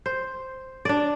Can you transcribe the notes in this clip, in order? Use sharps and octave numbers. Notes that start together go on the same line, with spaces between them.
C5
D4 D5